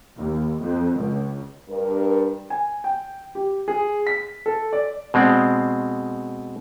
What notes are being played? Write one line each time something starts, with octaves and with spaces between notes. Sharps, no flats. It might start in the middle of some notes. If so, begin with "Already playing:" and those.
D#2
F2
C#2
G2 A#4
G#5
G5
G4
G#4
B6
A4
D5
B2 G#3 C4 D5